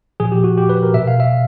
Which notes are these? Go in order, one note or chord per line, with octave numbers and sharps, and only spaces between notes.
A#2 F3 G#4
G4
F#4
G4
B4
A#4
B2 E5
F5
E5